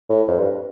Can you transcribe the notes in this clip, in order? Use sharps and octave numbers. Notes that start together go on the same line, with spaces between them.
A2
F2
G2